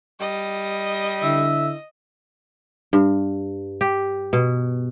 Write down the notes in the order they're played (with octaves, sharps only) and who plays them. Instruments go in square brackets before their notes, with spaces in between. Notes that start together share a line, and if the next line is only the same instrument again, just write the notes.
[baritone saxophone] G3 [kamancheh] D#5
[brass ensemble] D3 E4 [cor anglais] E5
[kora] G2
G4
B2